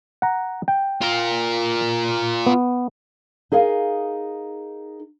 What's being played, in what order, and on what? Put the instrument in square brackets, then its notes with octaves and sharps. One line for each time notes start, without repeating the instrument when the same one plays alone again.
[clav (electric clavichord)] F#5 A#5
G5
[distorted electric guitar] F4 A#4
[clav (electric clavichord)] B3
[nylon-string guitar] D#4 G#4 A#4 F5